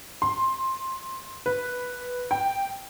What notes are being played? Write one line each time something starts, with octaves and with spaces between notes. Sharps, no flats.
C6
B4
G5